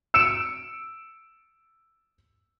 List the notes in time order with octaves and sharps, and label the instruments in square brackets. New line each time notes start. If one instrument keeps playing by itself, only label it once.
[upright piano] E6 C#7 D7 E7